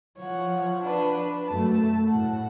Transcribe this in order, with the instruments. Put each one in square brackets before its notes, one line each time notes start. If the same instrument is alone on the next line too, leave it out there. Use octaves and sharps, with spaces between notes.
[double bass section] F3 [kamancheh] C#5 F#5
[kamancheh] D4 B4
[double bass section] F#2 A3 [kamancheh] A5
[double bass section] A2 [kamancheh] F#5